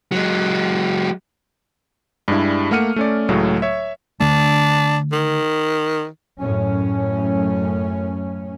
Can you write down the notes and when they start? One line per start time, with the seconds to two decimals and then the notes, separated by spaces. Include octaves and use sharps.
0.12 F#3 G#3
2.28 G2 G3 G#3 D4 E4
2.71 A3 A#3 F#5 F6 C#7 D#7
2.96 A3 C#4 D5
3.29 C#2 A2 F#3 G#3 A3
3.62 C#5 E5
4.20 D3 A3 D4
5.12 D#3
6.39 F#2 A2 C#4